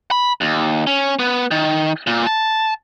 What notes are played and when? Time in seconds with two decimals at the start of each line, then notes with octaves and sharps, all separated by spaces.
0.11 B5
0.41 D#2
0.87 C#4
1.19 B3
1.51 D#3
2.07 A#2
2.27 A5